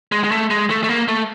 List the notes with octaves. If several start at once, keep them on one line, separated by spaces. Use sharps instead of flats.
G#3
G#3
A3
G#3
A3
A3
A#3
A3